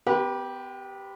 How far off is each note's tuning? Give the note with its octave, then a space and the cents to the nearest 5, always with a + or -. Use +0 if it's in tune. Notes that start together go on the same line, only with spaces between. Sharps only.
B3 +35 G4 +0 B4 -40